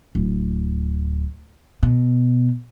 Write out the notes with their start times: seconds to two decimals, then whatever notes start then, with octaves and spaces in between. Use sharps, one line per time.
0.15 D1
1.83 B2